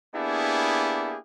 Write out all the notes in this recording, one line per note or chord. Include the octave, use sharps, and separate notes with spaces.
A#3 B3 D4 E4 G4 G#4